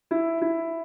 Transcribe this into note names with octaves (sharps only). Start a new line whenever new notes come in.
E4
E4